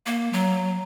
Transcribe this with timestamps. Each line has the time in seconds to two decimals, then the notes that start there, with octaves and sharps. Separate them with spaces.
0.06 A#3
0.33 F#3